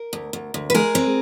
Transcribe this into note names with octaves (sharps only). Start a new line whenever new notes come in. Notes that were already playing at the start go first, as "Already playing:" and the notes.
Already playing: A#4
D2
D2
D2
B4
G#3 G#4 A#4
C4